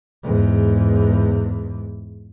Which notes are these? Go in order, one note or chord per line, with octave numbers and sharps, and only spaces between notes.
E2 G#2